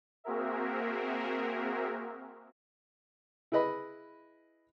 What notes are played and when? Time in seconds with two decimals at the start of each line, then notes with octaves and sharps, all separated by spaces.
0.24 A#3 C4 F#4 G#4 A#4 E5
3.52 E4 G#4 B4 D#5 B5